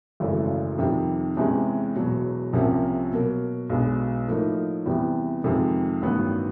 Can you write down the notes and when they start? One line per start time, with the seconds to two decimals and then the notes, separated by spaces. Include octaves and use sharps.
0.20 G#1 F#2 C#3 E3 A3
0.78 F2 C3 D#3 G3
1.37 E2 C3 E3 G#3 C#4
1.96 E1 E2 B2 F#3
2.53 C2 C3 F3 A#3 C#4
3.11 B2 F#3 A#3
3.70 B1 B2 G#3 B3 D4
4.28 A2 F3 A#3 D#4
4.86 E2 C3 E3 G3 B3
5.44 F2 C3 D#3 G#3
6.02 A1 G2 D#3 F#3 B3